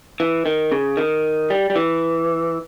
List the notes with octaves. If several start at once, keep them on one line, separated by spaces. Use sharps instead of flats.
E3
D#3
C#3
D#3
G3
G3
E3